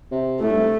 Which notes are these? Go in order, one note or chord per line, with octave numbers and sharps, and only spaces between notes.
C3
A2 A3
G2
C3